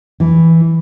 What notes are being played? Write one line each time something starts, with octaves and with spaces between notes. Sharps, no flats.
E3